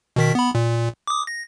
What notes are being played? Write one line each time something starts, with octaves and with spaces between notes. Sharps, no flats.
B2 D#3 B6
B3 B5
A#2
D6 D#6
A#6